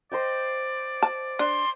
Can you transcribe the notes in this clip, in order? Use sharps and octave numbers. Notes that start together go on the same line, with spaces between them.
C5 D5 D#5 G5
A5
D4 C6